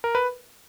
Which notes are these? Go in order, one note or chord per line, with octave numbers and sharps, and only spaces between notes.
A#4
B4